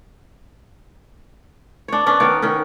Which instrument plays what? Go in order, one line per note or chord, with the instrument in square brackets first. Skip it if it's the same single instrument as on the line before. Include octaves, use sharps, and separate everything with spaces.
[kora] D4 C#5
B3 C#4 D4
D#3 B3 A#4 C#5
D#3 C#4